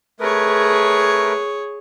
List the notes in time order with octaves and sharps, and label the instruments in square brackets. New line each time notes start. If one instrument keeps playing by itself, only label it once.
[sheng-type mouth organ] A3 A#4 B4 [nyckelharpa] G#4 C#5